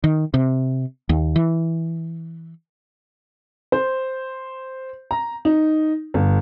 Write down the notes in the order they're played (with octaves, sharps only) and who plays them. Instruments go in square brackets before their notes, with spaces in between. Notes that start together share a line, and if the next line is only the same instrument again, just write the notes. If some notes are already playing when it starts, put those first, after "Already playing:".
[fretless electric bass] D#3
C3
D#2
E3
[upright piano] C5
A#5
D#4
G1